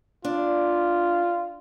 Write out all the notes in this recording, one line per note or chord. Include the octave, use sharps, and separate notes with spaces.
D4 F4